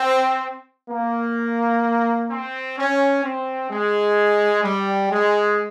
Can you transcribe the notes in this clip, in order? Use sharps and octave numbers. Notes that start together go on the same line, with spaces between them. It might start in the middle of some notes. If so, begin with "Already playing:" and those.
Already playing: C4
A#3
C4
C#4
C4
G#3
G3
G#3